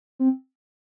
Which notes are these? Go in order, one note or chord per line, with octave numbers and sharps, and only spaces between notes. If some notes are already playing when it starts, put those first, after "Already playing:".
C4